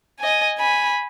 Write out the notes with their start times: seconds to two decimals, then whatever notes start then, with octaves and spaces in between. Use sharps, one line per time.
0.19 D#5 G#5
0.58 G#5 B5